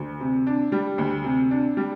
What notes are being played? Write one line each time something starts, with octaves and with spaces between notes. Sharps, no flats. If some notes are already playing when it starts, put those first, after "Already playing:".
Already playing: D2
C3
D4
G3
D2
C3
D4
G3